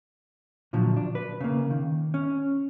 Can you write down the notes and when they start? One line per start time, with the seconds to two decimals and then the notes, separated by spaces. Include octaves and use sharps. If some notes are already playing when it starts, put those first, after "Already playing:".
0.73 A#2 D3 F3 F#3
0.97 D4
1.15 B4
1.41 C#3 A#3
1.71 D#3
2.14 C#4